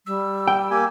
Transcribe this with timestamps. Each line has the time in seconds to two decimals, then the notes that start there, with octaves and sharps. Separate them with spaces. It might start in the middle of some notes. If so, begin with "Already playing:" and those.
0.06 G3 E6
0.48 G5
0.71 A#3 G4 G#5